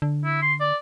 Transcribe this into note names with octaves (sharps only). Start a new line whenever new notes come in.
D3
E4
C6
D5